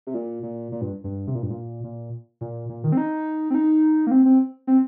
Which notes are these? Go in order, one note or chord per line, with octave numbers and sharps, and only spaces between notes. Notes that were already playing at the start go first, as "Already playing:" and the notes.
C3
A#2
A#2
A#2
G2
G2
C3
A#2
G2
A#2
A#2
A#2
A#2
D#3
C4
D#4
C4
D#4
A#3
C4
C4
C4